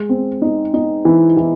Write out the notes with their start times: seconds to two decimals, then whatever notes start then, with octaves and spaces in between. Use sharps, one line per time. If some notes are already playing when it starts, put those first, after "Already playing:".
Already playing: G#3
0.09 C4
0.42 D#4
0.74 D#4
1.05 E3
1.37 E3